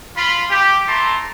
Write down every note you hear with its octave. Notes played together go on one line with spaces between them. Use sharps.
F4 B5
G4
A3 E4 A5 A#5 C6